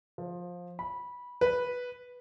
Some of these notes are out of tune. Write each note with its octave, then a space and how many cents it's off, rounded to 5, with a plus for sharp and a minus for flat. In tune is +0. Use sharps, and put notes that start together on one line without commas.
F3 +15
B5 -15
B4 -5